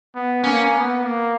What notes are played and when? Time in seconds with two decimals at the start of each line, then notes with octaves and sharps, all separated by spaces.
0.15 B3
0.44 A#3 C#4
0.74 B3
1.03 A#3